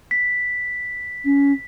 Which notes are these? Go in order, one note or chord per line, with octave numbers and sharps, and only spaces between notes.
B6
C#4